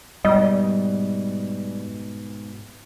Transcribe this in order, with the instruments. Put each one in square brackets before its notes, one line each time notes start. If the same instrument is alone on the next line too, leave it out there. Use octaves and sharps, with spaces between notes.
[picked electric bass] G#2 B2 [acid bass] G3 [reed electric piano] D#5